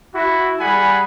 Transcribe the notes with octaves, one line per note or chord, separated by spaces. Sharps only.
E4 F#4
G3 G#4 F#5 G#5 B5